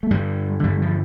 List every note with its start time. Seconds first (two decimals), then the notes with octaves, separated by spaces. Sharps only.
0.03 A3
0.11 G2 D3 G3
0.63 G2 D3 G3
0.82 F3